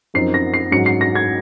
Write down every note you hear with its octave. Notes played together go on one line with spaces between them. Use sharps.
F#2 F3 C4 D#4 C7
A#6
C7
G#2 F#3 C#4 C#7
C7
A#6
G#6